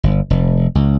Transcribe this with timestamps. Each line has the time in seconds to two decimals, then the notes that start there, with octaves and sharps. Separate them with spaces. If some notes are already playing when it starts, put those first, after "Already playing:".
0.03 G1
0.30 F1
0.75 C#2